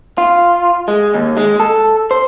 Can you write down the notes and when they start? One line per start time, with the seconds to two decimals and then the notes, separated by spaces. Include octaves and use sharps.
0.18 F4
0.88 G#3
1.14 D#2
1.37 G#3
1.60 A4
2.11 C5